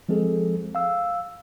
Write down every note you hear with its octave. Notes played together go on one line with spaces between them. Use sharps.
F3 G#3 C4 G#4 A4
F5 E6